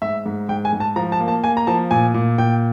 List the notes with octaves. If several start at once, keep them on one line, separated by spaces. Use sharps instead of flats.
G#2 E5
G#2
G#2 G5
G#5
G#2
A5
F3 A#5
A5
A#3
A5
A#3 G#5
A#5
F3 A5
A#2 G#5
A#2
A#2 G5